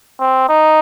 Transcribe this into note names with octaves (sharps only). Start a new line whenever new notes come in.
C4
D#4